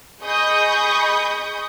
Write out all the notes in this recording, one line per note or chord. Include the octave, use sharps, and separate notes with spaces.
G#4 D#5 B5 C#6 D#6 G6